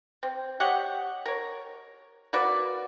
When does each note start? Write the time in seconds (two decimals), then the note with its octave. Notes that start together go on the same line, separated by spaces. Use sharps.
0.23 C4
0.60 G4 C#5 D#5 F#5
1.26 A#4 C#5
2.33 A#3 F#4 B4 D5